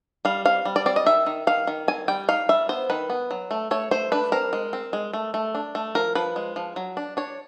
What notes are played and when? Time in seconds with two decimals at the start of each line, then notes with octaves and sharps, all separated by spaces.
0.25 G3 F5
0.45 C4 F5
0.65 G3
0.76 D5
0.86 C4 D5
0.96 D#5
1.06 D#3 E5
1.26 D#3
1.47 D#3 F5
1.67 D#3
1.88 C4 G#5
2.08 G3 G5
2.28 D#4 F5
2.49 G3 E5
2.69 B3 C5
2.90 D#3 B4
3.10 B3
3.31 F#3
3.51 A3
3.71 A3 C#5
3.91 A3 C5
4.12 D4 B4
4.32 C4 A#4
4.53 G#3
4.73 C4
4.93 G#3
5.13 A3
5.34 A3
5.55 D4
5.75 A3
5.95 F3 A#4
6.15 F3 B4
6.36 G#3
6.56 F3
6.76 F#3
6.97 D4
7.17 D4 C#5